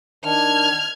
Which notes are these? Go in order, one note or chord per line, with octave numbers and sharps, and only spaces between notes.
D#3 D4 F6 G#6